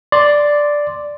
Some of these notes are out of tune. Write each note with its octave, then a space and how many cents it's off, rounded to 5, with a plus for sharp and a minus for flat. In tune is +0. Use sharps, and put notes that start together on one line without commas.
D5 +0 C6 +0